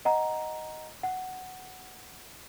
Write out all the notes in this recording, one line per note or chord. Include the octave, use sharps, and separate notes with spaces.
D#5 F#5 A#5
F#5